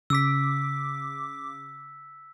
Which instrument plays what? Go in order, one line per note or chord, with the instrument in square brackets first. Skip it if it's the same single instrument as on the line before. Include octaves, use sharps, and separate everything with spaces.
[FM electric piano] C#3 D6 [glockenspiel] E6 B6